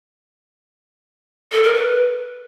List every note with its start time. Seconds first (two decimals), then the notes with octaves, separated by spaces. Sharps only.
1.52 A4
1.63 A#4
1.74 B4